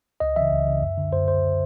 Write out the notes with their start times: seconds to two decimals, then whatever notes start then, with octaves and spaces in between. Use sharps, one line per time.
0.20 C#2 D#5
0.36 C#3 E3 E5
0.52 C#2
0.67 C#3 E3
0.82 F#2
0.98 D3
1.13 F#2 C5
1.28 D3 C5